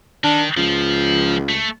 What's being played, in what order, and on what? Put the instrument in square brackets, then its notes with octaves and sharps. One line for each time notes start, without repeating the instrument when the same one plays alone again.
[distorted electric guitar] D#3 [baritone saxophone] D4
[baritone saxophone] C#2 [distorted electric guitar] F3
[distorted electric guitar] A3